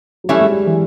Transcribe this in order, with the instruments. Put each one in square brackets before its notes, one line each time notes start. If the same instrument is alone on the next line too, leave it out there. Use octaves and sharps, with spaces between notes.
[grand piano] F#3
[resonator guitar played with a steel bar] E3 A3 C#4 E4 [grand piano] G3
[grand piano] G#3
G3
E3